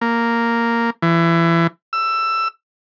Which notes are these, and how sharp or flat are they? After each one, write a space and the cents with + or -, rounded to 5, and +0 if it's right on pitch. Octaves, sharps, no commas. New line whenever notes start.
A#3 -5
E3 +25
E6 +15